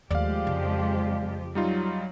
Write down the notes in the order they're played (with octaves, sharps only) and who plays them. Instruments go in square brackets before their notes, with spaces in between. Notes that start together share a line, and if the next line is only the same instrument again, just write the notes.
[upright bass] D#2 A3 [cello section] F3 G#3 G4 [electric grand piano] D5 F5
[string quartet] F2 [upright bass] C#3
[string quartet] F#3 [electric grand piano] G3 D#4 F4